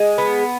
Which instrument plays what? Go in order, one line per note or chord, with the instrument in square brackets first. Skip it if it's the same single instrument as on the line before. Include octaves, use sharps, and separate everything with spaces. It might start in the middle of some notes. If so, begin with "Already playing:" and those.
Already playing: [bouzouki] G#3
B3